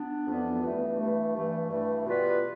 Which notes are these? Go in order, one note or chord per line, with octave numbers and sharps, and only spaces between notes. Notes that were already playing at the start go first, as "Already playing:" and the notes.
Already playing: B3 D4
F2 E3 B3 D4
G2 E3 A3
G2 E3 A3
G2 E3 A3
G2 E3 A3
B2 G3 B3 F4 B4